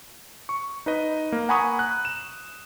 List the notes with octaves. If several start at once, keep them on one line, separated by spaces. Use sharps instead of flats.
C#6
D#4 B4 D#5
A#3
F#5 G#5 A#5 B5 C#6 D#6
F#6
E7